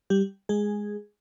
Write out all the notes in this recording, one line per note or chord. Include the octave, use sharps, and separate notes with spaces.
G3 G4
G#3 G#4